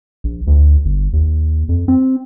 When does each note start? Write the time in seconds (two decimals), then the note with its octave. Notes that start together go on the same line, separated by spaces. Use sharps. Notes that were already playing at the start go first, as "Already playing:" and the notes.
0.24 A#1
0.47 D2
0.85 G1
1.13 D#2
1.69 F2
1.88 C4